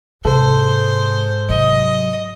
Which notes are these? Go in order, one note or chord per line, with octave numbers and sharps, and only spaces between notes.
G#2 C3 A4 C5
C3 F#3 D#5